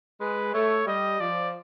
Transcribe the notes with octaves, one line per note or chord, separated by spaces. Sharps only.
G#3 B4
A3 C#5
G3 D#5
F3 D5